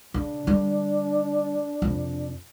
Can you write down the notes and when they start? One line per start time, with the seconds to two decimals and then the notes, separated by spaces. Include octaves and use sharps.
0.14 C#3 D4
0.47 D3 G3
1.82 F2 C3